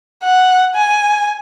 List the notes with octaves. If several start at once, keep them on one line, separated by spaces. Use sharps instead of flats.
F#5
G#5